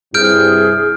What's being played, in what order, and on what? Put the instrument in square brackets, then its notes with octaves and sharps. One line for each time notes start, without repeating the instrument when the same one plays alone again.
[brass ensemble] G2 C3 E4 [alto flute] G#4 [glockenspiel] F6 G6 D7